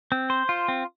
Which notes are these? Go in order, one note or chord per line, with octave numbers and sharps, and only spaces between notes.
C4
C5
F4
C4